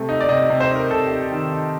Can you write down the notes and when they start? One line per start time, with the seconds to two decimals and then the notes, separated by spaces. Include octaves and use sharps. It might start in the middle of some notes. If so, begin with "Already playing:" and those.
Already playing: C3 A3
0.09 D#4
0.21 D5
0.29 C3 D#5
0.50 C3
0.60 C5
0.70 D#4
0.76 A#4
0.91 C3 A4
1.06 G4
1.11 D#4
1.22 G4
1.32 D#3
1.52 D#4